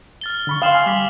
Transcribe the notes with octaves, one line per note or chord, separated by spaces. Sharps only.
F6 A6 G7
D3 B5 C#6
F5 G5 C6 D#6 E7 F#7
G#5
G3 D6 F6 B6